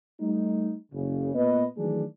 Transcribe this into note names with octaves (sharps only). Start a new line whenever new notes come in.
G3 A3 D#4
F#1 C#3
A#2 B3 B4 D#5
D#3 E3 F#3 A3 D4 G#4